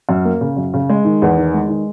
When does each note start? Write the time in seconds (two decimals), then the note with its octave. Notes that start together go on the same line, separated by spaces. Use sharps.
0.09 F#2
0.25 A#3
0.41 C#3
0.57 F#2
0.73 C#3
0.89 G#3
1.05 D#3
1.22 E2
1.38 D#3
1.54 G#3
1.69 D#3